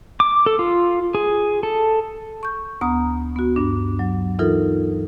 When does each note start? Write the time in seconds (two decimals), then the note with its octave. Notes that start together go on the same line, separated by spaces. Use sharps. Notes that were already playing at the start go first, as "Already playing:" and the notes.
0.20 D6
0.46 A4
0.59 F4
1.15 G#4
1.63 A4
2.43 C#6 G6
2.81 D2 B3 A#5 D#6
3.36 B3 F#4
3.56 G2 D4
3.99 F#3
4.39 E3 D#4 F4 A4 A#4